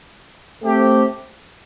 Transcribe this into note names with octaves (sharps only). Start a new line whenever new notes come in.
A3 C4 G4